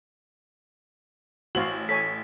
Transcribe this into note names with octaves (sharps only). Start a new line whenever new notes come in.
A1 F#4 C5 F5 F#7
A4 C#5 G#5 B6